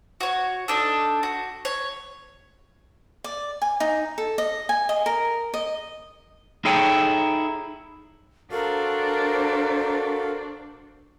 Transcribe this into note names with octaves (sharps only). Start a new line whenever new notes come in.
F#4 C#5
D4 D#4 A4
F#4
C#5
D5
G#5
D#4
A4
D#5
G#5
D#5
A#4
D#5
D#4 E4 G#4 A4 C#5 G5
D4 F#4 A4 A#4 C5 F5